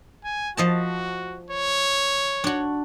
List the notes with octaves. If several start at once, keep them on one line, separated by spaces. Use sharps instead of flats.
G#5
F3 F#4 D#5 A5
C#5
D4 F#4